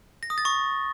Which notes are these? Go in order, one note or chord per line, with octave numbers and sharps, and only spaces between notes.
A#6
D#6
A6
C#6